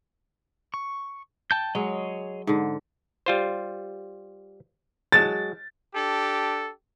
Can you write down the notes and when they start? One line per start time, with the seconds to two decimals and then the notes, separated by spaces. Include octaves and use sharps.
0.74 C#6
1.51 G5 A5 G6
1.75 F#3 G#3 G#4 C#5 D#5
2.47 G#2 D3
3.26 G3 F4 C5
5.12 F#3 G#3 A5 A6
5.95 D4 G4 A4